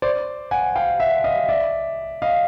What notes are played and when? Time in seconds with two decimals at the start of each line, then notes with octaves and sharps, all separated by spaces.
0.02 C5 D5
0.51 F#5 G#5
0.76 F5 G5
1.00 E5 F#5
1.24 D#5 F5
1.49 D5 E5
2.22 D#5 F5